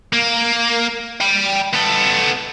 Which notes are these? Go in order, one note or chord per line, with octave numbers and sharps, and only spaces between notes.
A#3
G5 B5
B3 A4